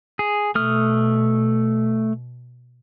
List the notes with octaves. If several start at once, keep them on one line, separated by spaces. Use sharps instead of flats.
G#4
B2 A3 D#6 F6